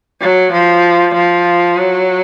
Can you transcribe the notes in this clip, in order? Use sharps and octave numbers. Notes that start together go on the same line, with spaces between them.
F#3
F3
F3
F#3